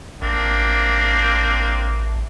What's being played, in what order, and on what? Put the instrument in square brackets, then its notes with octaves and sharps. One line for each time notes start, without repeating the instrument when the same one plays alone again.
[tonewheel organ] A1 [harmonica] A#3 C4 D4